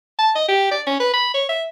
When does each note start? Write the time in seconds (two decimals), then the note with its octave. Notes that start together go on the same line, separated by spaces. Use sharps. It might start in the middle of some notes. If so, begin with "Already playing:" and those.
0.19 A5
0.35 D#5
0.48 G4
0.71 D5
0.87 C#4
1.00 B4
1.13 B5
1.34 C#5
1.49 E5